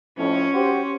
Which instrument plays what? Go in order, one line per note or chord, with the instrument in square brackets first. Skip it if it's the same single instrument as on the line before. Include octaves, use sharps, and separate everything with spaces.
[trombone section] F2 A2 [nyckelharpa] C#4
[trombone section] F#4 G4 C5